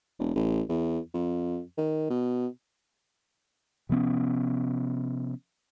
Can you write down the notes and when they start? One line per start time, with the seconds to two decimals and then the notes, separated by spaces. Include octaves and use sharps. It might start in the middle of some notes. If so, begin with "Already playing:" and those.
0.19 E1
0.35 A1
0.69 E2
1.14 F2
1.78 D#3
2.10 B2
3.89 C3 F3 B3 C#4